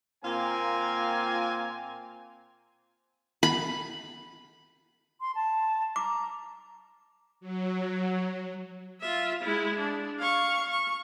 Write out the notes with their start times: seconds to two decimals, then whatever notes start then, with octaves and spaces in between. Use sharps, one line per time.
0.24 A#2 A#3 C4 F4 G#5
3.43 B5
5.21 C6
5.35 A5
5.96 A#5 D6
7.41 F#3
9.01 F4 E5
9.43 G#3 E4
9.79 D4
10.19 F5 C#6
10.70 C#6